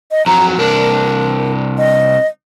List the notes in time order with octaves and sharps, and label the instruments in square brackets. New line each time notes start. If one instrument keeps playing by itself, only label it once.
[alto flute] D#5
[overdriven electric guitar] F2 F#3 [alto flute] A#5
[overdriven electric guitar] C2 D4 [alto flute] A#4
[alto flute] D#5